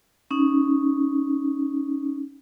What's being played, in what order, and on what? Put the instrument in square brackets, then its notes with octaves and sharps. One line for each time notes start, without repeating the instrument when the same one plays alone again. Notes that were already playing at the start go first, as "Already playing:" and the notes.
[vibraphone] C#4 D#4